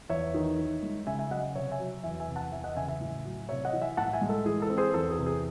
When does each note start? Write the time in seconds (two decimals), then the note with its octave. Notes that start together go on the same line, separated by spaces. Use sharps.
0.10 E2 C#5 E5
0.34 D#3
0.58 D#3
0.83 G#3
1.07 C#3 E5 G#5
1.19 E5 G#5
1.31 F#3 D#5 F#5
1.55 C3 C#5 E5
1.71 E5 G#5
1.79 F#3
2.03 E2 E5 G#5
2.20 E5 G#5
2.28 C3
2.36 F#5 A5
2.52 E2 E5 G#5
2.64 D#5 F#5
2.76 C#3 E5 G#5
2.88 E5 G#5
3.01 A2
3.25 F#3
3.49 C3 C#5 E5
3.65 D#5 F#5
3.73 E3
3.82 E5 G#5
3.97 A2 F#5 A5
4.13 E5 G#5
4.21 G#3
4.29 A4
4.46 E3 G#4
4.62 A4
4.70 C4
4.78 G#4 C5
4.94 E2 A4
5.10 G#4
5.19 C3
5.26 G#4